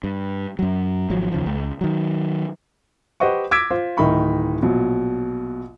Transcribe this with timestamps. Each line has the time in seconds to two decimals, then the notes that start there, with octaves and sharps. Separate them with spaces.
0.04 G2
0.59 F#2 F#3
1.10 G#1 F3 F#3
1.32 D#2 C#3 F3
1.46 C#2
1.81 D#3 F#3
3.20 G4 B4 C5 D#5 F#5 C#6
3.51 D6 E6 G#6 A#6 B6 D7
3.71 F4 C5
3.97 D1 D#3 D#4 E5 B5 C#6
4.62 A#1 B2 F#3